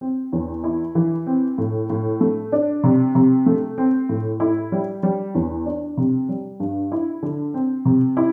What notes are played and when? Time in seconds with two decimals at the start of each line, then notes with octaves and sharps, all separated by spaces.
0.01 C4
0.33 E2
0.64 E4
0.95 E3
1.27 C4
1.58 A2
1.90 A2
2.21 A3
2.52 D4
2.84 C3
3.15 C3
3.46 A3
3.78 C4
4.09 A2
4.40 E4
4.72 G3
5.03 G3
5.35 E2
5.66 D4
5.97 C3
6.29 G3
6.60 G2
6.92 E4
7.23 D3
7.54 C4
7.85 C3
8.17 E4